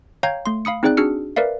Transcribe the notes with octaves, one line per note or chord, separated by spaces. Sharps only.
C#5 F5 G5 A#5 G6 G#6
A3 C6
F5 B5 D#6 C#7
C4 D#4 G#4 D5 G5 F#6
D4 F#4 G#4 E6 F6 C#7
A#4 B4 D5 E5 F5